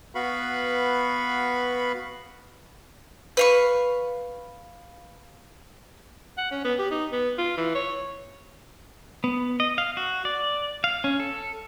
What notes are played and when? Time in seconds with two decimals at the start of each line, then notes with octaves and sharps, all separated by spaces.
0.15 B3 F#4 B4 F5 B5 C#6
3.37 B4 F5 C#6
6.38 F#5
6.51 C#4
6.64 B3
6.79 G4
6.91 D#4
7.12 B3
7.38 F4
7.58 E3
7.75 C#5
9.24 B3
9.60 D#5
9.78 F5
9.97 F#4
10.25 D5
10.84 F5
11.04 C#4
11.20 A4